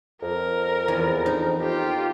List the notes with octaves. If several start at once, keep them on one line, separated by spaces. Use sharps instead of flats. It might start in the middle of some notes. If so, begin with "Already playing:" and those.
F2 A#4
E2
D#4
F4 G4